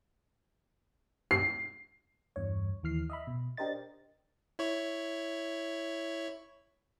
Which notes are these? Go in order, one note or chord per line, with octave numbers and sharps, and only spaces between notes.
C7
E2 G2 C#5
D#2 E3 F6 C7
D#5 E5 B5
B2
D4 G4 A#4 C5 D#5 A6
E4 C#5